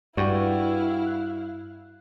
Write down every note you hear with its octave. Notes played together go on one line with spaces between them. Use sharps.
G2 E4 F#4 B4 D5 F5 G5 C#6
F#6